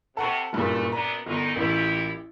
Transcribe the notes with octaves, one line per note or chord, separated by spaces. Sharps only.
C3 A4 F#5 C#6
F#1 G2 A#2 A3
F#2 B3 D4 A#5
G1 F#2 E3 D#4
A1 A#2 E4 G4